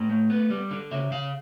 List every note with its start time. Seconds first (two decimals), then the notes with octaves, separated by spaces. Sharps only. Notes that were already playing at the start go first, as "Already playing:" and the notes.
Already playing: A2 A#5
0.09 A3
0.30 B3
0.50 G3
0.71 D3
0.91 C#3 E5
1.11 C#3 F5